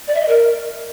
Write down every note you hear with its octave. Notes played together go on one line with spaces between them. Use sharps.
D5
E5
D#5
A#4